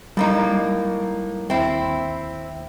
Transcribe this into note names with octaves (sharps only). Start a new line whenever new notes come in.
A2 G3 A#3 D#4
D#2 C4 E4